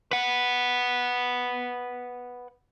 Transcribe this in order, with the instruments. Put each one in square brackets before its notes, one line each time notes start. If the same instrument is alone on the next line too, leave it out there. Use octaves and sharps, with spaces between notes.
[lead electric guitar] B4 F#5